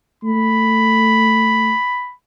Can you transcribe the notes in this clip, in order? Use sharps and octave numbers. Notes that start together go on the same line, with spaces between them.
A3 B5